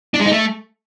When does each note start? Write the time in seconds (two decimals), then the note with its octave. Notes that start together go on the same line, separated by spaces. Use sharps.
0.14 D4
0.20 G#3
0.26 D#4
0.32 A3